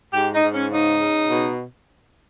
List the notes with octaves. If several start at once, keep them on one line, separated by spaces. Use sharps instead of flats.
G#2 G4
D#4
G#2
C#4
C#3 D#4
C#3
B2